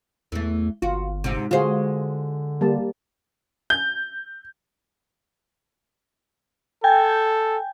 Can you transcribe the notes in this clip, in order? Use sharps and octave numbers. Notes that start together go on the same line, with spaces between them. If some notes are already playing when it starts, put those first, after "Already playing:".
E2 E3 A3
G1 F4 F#4
G#2 C3
D3 G#3 F4 F#4 G#4 C5
G3 A#3 A5
G6
A4 G5 G#5 G6